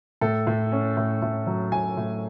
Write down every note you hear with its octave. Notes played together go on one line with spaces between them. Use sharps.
A2 A4
A2
C#4
A2
A2
F#3
A2 G#5
A2